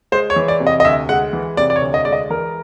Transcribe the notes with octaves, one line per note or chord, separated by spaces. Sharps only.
G#3 C5
C#5
E3
D5
C3
D#5
D#5
D2 E5
G#3 F#5
E3
C3 D5
D5
C#5
D2
D#5
G#3 D5
D#5
E3 A#4